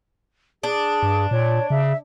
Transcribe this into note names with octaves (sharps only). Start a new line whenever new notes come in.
D4 G#4
G2
A#2 C#5
C#3 E5